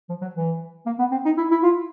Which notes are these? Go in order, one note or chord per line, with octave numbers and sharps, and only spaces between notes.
F3
F#3
E3
A#3
B3
C4
D#4
E4
E4
F4